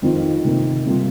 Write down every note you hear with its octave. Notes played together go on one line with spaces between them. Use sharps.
F2 D#3 C4 F4
C3 D#3 A#3 D#4
C3 G3 A#3 F4